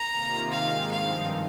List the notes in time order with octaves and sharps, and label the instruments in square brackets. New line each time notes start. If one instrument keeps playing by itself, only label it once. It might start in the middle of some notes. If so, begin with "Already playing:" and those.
Already playing: [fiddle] A#5
[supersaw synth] C3 D#3 A#3 F4
[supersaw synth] G#2 D#3 G#3 [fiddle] F5
[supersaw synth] G2 F3 C4 D#4 [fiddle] F5